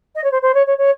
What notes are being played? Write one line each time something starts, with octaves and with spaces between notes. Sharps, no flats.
D#5
C#5
C5
C5
C#5
C#5
C#5